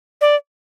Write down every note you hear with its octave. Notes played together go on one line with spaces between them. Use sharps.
D5